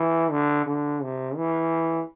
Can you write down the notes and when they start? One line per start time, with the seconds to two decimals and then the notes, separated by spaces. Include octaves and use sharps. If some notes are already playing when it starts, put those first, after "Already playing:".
Already playing: E3
0.31 D3
0.66 D3
1.02 C3
1.36 E3